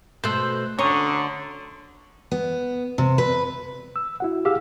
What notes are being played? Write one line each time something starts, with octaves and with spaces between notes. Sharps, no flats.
B2 A3 C5 E6 F#6 G6
D2 D3 C#4 A#5 C6 C#6 D#6
B3
C3
B4
E6
E4 F#4 F#5
G4 G#4 F5 E6